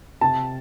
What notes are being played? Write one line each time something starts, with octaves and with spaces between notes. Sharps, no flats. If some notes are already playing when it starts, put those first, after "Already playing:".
C3 A5